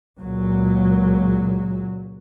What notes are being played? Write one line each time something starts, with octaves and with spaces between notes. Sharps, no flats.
C#2 A#2 F#3